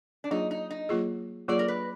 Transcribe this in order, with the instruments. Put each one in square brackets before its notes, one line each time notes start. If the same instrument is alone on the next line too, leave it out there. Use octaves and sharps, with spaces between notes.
[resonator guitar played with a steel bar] D4
[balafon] F#3 A#3 F4 G#4 [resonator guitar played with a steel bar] D#4
[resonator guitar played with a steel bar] D#4
D#4
[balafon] F#3 A#3 F4 G#4
[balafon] F#3 A#3 F4 G#4 [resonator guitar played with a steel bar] D5
[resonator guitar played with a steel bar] A#4
B4